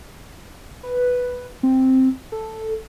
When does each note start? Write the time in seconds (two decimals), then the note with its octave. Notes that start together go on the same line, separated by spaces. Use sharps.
0.83 B4
1.63 C4
2.32 A4